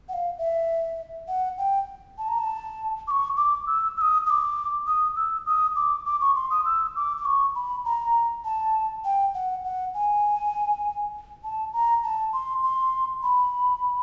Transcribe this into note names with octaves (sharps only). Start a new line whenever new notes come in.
F#5
F5
E5
F#5
G5
A5
A#5
A5
D6
C#6
D6
E6
E6
D#6
D#6
D6
D#6
E6
D#6
D6
D6
C#6
C6
D#6
E6
D6
D6
C#6
B5
A#5
A5
G5
F#5
F#5
G#5
A5
A#5
A5
C6
C6
B5